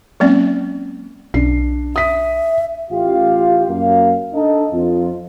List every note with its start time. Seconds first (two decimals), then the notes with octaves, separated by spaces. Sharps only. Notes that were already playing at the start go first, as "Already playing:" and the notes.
0.20 F#3 G#3 A#3 C4 C#4 D5
1.34 B1 D4 C7
1.96 E5 D#6 B6
2.91 A1 F4 G4 F5
3.69 F#2 A#3 F5
4.34 D4 D#4 A4 D#5
4.72 F2 F4